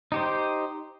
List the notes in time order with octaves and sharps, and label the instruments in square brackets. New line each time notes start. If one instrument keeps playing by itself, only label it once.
[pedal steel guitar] D#4 G4 C5